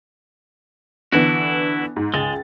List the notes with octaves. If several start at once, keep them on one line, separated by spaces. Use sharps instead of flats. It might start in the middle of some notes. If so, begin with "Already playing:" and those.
D3 E3 B3 D4 E4 F#4
G#2
C#2 G#3 G#4 A6